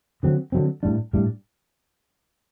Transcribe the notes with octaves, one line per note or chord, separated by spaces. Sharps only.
D3 F#3 C4
D3 F#3 C4
A2 G3 D4
A2 G3 D4